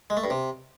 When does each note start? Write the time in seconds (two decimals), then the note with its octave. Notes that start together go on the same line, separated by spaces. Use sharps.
0.10 G#3
0.17 A3
0.24 G2
0.30 C3